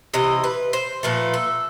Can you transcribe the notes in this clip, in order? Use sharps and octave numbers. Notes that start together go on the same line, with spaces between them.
C3 E3 D#5
B4
C5
A#2 F3 A3 B4
A4